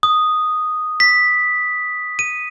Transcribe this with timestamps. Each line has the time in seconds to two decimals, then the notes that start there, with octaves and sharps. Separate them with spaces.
0.03 D#6
1.00 B6
2.19 D#7